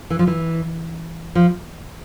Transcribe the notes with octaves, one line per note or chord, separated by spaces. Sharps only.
E3
F3
E3
F3